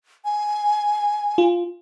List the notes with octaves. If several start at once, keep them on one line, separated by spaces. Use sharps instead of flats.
G#5
F4